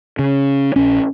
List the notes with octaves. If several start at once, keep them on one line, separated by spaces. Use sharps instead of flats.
C#3
A#1 C#4